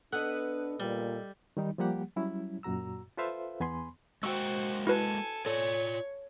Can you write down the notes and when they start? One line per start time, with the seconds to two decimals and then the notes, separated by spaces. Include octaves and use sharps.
0.13 B3 D4 A4 B4 D#5 F#5
0.80 A#2 G3
1.57 D#3 G3 D#4
1.78 F3 G3 A#3 G4 F#5
2.16 F#3 G3 C#4 E4
2.63 F#2 A#2 F#4 A#5 E6
3.17 F4 A4 B4 C5 E5 F5
3.60 E2 B3 G#5 B5 C6
4.23 G#3 A#3 F#4 C5 G5 C#6 E6
4.87 E4 F#4 A4 B4 G#5
5.46 F4 A4 C#5 D5